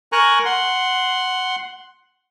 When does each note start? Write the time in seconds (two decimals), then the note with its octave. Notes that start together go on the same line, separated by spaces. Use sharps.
0.12 A#4 G#5 A#5 C#6 F#6
0.45 F#5 C6